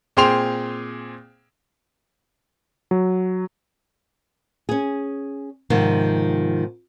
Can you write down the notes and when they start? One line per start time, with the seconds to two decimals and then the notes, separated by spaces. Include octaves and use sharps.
0.17 A#2 C4 G#4 G5 C6 F7
2.91 F#3
4.69 C#4 G#4
5.70 G#2 C3 D#3 F3